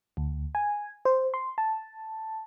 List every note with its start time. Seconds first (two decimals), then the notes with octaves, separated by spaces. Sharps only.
0.17 D2
0.55 G#5
1.05 C5
1.34 C6
1.58 A5